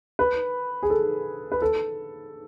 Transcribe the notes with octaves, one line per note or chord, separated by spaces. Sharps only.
B4
G#4
A4
B4
A4